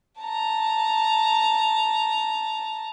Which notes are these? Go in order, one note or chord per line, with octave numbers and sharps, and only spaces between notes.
A5 A#5